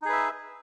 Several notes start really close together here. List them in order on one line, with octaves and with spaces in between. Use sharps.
D#4 G#4 B4 E5